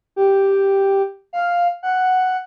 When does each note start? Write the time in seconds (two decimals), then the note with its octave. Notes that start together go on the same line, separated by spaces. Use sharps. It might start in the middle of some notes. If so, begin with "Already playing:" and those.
0.16 G4
1.33 F5
1.83 F#5